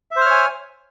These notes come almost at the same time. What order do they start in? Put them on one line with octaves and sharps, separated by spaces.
E5 C5 F6 C#5 G#5